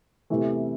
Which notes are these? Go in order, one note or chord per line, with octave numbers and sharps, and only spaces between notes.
E2 C3 E3 A3